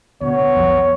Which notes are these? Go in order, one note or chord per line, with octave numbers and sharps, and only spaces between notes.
D2 B2 B3 C#5
B1 F2 F3